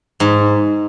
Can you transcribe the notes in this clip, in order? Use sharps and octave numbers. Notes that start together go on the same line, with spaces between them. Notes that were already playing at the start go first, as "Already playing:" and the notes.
G#2